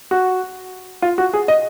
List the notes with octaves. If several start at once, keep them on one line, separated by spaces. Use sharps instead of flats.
F#4
F4
F#4
G#4
D#5